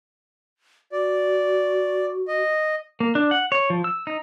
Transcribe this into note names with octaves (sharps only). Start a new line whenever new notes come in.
F#4 D5
D#5
A#3
D4
F#5
C#5
F3
E6
D#4